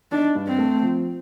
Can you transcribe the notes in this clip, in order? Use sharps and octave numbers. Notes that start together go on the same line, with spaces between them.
D4 D#4
G2
C4
A3
F3